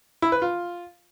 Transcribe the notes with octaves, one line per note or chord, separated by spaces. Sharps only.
E4
B4
F4